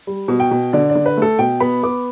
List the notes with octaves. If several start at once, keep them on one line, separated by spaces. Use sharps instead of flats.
G3
B2
G5
B2
D3 D5
D5
D3
B4
A3 A4
B2 G5
B3 B5
B3 D6